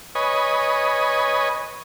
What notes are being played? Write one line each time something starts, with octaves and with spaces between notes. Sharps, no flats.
B4 C#5 D#5 G#5